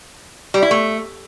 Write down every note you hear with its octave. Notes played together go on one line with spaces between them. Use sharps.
G3
E4
A3